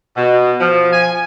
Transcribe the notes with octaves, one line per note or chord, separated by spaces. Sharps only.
B2
F3
G#5